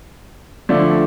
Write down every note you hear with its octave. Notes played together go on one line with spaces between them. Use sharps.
D3 F3 A3 D4